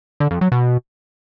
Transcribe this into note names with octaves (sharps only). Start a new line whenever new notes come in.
D3
F2
F#3
B2